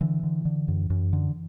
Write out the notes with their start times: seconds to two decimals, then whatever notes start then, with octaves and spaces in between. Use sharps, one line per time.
0.01 D3 E3
0.23 D3
0.45 D3
0.68 F#2
0.90 F#2
1.13 D3